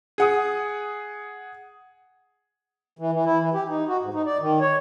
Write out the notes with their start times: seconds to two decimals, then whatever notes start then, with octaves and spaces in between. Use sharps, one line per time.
0.18 G#4 F#5 D#6
2.99 E3
3.12 E3
3.25 E4
3.40 E3
3.54 G4
3.69 D#4
3.88 F#4
4.02 G#2
4.14 D#4
4.26 D5
4.41 D#3
4.61 C#5